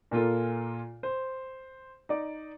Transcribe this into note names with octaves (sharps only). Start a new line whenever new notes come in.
A#2 A#3 F4 A4
C5
D#4 D5